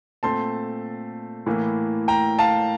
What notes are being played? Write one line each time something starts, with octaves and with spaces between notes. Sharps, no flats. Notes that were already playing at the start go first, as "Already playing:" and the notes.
A#2 A3 C4 A5 C6
A2 E3 A#3
G5 A#5
F5 A5